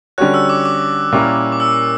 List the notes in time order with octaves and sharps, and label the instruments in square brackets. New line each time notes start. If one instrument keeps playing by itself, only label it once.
[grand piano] D3 G3 C#4 F#4 C#5 [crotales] F#6
[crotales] E6
D6
D6
[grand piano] A#2 G3 C#4 E4 A#4
[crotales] D6
E6